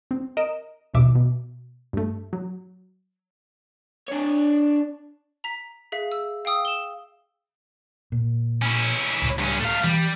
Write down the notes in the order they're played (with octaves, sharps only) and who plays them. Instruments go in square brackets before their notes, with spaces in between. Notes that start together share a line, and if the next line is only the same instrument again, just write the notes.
[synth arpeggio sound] C4
A#4 D#5 D7 E7
A#1 D#2 B2 E5 D6
B2
G2 A3
F#3
[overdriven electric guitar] D4 C#5
[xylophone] A#5 B6
G#4 E5 F5
E6
F5 G5 D#6 E6
E7 G7
[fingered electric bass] A#2
[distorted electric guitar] C#4 E4
[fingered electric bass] C#2 A2
[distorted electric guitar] G2 C#4
A3 F5
[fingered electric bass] E3 [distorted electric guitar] G3